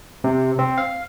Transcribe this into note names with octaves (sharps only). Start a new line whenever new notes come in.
C3
C4
F5